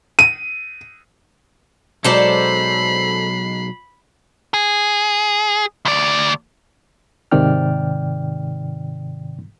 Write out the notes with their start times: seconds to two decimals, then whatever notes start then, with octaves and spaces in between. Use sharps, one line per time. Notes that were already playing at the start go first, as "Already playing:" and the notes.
0.19 D#7
2.04 B1 F#3 G#3 A4 C5 D5 B5 C7
4.54 G#4
5.85 D2 D5
7.32 G#2 C3 D#3 D5 G5 F6